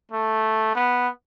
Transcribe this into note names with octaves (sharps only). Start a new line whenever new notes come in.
A3
B3